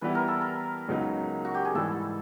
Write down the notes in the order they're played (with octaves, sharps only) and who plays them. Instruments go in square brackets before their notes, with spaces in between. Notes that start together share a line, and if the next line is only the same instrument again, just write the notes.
[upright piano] E3 G3 B3 E4 [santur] B4
[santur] A#4
A4
A#4
[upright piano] C#2 C#3 F#3 B3 D#4
[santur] F#4
G4
G#4
[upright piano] G#2 E3 G3 [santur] A4